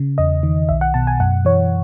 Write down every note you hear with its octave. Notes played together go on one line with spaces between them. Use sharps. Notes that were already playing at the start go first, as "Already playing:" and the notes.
Already playing: C#3
E2 D#5
D#3
B1 E5
F#5
B2 A5
G#5
F#2 F#5
E3 C#5